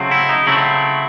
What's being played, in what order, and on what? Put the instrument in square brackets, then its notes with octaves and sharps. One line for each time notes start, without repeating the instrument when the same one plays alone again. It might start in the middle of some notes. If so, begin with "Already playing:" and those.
Already playing: [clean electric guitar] C#3 F#3 A3 C4
E4
D#4
C#3 F#3 A3 C4 E4